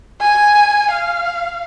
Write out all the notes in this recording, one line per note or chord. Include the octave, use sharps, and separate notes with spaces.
G#5
F5